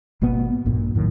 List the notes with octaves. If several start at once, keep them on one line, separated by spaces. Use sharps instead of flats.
G#1 B2 A#3 B3
A#1 G2 A#2
F#2 A2 D#3 F#3